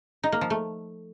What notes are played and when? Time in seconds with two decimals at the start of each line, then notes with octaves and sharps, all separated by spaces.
0.23 D#4
0.32 A#3
0.41 F3
0.50 A3